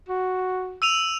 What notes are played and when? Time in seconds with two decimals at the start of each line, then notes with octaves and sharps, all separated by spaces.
0.09 F#4
0.82 E6 D#7 F7